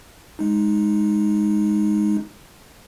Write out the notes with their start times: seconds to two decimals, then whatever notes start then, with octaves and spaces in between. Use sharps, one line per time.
0.39 G#3 D#4